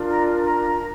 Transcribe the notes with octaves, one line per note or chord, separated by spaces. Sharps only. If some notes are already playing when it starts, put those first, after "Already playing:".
Already playing: D4 F4 A#4
A#5
A#5